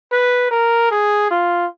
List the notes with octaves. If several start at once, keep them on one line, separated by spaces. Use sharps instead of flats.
B4
A#4
G#4
F4